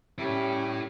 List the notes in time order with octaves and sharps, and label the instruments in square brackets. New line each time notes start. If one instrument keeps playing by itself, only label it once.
[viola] G3 C#4 [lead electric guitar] E4 A4